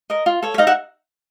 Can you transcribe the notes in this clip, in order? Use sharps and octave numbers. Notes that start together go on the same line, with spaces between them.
A#4 D#5
F4
A4 C#5
E5
D#4 D#5 F5
E5 F#5